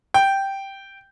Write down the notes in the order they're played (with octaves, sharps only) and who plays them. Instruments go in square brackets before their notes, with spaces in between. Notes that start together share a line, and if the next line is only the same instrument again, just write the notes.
[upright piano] G5